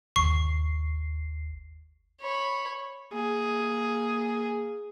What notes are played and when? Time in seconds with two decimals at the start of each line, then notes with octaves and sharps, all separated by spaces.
0.16 G1 D#2 C#6 C7
2.21 C#5 B5
3.13 A#3 G#4